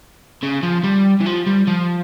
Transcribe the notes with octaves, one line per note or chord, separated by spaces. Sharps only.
C#3
F3
G3
E3
F3
G3
F3